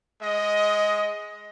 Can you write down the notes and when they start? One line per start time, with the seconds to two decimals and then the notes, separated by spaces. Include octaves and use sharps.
0.22 G#3 D#5